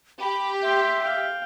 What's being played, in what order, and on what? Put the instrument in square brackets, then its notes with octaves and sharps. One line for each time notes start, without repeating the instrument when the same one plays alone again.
[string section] G4 [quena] B5
[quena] E5 [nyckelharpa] G5 C6
[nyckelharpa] F5 G5